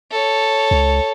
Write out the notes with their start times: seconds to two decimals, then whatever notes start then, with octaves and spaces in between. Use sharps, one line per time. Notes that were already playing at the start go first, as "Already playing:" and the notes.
0.11 A4 C#5
0.71 C#2